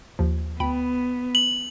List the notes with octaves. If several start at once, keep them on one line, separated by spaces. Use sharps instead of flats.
D#2 F3
D2 B3 G5 B5
F#7